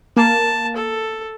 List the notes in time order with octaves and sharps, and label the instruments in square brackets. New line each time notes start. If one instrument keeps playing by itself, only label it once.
[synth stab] A#3 [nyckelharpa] A5
[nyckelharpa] A4